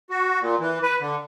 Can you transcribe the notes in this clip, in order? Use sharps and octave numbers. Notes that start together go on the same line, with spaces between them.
F#4
A#2
E3
B4
D3